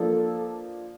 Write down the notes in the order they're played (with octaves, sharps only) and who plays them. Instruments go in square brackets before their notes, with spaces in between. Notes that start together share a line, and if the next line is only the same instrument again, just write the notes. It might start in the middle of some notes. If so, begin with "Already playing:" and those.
Already playing: [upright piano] F3 A#3 D4 [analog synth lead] A4